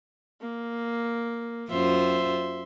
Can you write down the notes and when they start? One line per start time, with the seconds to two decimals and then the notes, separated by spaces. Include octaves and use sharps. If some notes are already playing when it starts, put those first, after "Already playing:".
0.41 A#3
1.70 F#2 F4 C5 E5 C6